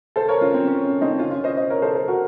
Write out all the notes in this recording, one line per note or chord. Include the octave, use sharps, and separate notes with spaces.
A4 C5
A#4 C#5
C#4 F4
C4
C#4
C#4
C4 D#4
C#4 F4
C#4 F4
C5 D#5
C5 D#5
A#4 C#5
A4 C5
A4 C5
F#4 A#4